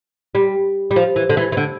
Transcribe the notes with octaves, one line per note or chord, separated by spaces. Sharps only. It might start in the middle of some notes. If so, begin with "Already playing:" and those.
G3
G3
F3
E3
D3
E3
E3
D3